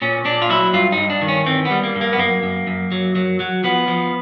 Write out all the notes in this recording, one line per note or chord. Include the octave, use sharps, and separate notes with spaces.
A#2 C#4
A#2 D4
F4
F#3 E4
G2 F4
D#4
G2
D4
D#3
C#4
E3 C4
B3
G3
A#3
G2
A#3
B3
F#2 A#3
F#2
F#2
F#3
F#3
F#3
F3 B3
F3